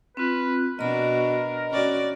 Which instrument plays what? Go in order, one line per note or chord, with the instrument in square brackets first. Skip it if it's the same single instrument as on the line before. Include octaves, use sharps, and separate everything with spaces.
[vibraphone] C4 F4 [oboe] B4
[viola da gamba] B2 D4 F#4 [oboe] A#4 [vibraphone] D#5 B5
[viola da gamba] C#4 F#4 D5